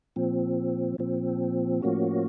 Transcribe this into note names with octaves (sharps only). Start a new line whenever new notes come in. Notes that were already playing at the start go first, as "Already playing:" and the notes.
A#2 F3 C4
A#2 F3 C4
A2 F3 A#3 C#4 F#4